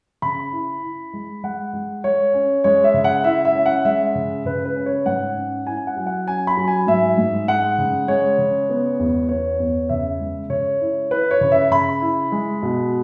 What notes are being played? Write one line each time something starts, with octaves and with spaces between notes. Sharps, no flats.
C#3 B5
E4
E4
G#3
G#3 F#5
G#3
G#3 C#5
C#4
G#3 C#5
E5
C#3
F#5
E4 E5
E5
C#4
F#5
G#3 E5
C#3
C#3 B4
B4
C#4
C#5
G#2 F#5
C#4
E4 G#5
F#5
F#3
F#5
C#4 G#5
B5
F#3
G#5
G#2 E5
G#2
G#3 F#5
C#3
G#3 C#5
C#3
B3
E2
B3 C#5
E2
C#3 E5
G#3
C#3 C#5
E4
E4 B4
C#5
C#3
E5
C#3 B5
E4
G#3
B2